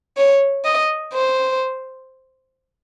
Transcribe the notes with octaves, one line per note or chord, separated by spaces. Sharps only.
C#5
D#5
C5